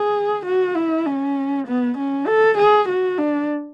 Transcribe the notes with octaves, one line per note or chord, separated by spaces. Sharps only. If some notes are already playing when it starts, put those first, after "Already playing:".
Already playing: G#4
F#4
E4
C#4
B3
C#4
A4
G#4
F#4
D4